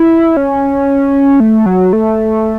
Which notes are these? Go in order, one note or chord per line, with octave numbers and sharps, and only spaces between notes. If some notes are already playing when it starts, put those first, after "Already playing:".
Already playing: E4
C#4
A3
F#3
A3